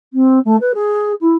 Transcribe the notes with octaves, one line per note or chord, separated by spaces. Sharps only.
C4
A3
B4
G#4
E4